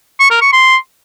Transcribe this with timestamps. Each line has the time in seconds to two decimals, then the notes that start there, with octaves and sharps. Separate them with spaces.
0.20 C#6
0.31 A#4
0.42 C#6
0.53 C6